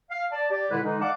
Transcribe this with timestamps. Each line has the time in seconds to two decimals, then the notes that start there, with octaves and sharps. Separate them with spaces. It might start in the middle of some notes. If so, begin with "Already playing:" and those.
0.10 F5
0.32 D5 A5
0.51 G4 D5
0.71 A#2 D3 E3 G#3 E4 B4
0.83 D3 E3 G#3 D#4
1.01 D5 D#5 F5 F#5 A5 D6